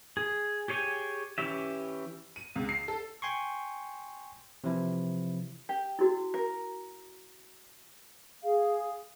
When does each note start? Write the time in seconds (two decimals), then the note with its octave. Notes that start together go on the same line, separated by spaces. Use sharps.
0.17 G#4
0.68 G4 G#4 C#5 G5 G#5
1.38 E3 C#4 G4 E5
2.36 D#7
2.56 C#2
2.69 C7
2.88 A4
3.22 G5 G#5 C6 C#6
4.64 C3 E3 F3 E4
5.69 G4
5.99 E4 F#4
6.34 A#4
8.43 G#4 F5